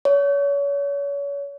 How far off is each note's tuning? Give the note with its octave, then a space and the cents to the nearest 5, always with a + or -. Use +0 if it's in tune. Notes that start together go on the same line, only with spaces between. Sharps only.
C#5 +30